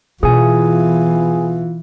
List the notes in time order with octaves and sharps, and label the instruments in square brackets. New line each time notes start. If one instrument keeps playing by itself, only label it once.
[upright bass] B2 [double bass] E3 [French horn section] B3 E4 F4 [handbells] G#4 G#5